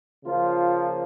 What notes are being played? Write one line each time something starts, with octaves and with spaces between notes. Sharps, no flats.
C#3 F3 A#3 F4